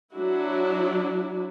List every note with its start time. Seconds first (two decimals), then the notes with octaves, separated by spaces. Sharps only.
0.13 F#3 D4 E4 F#4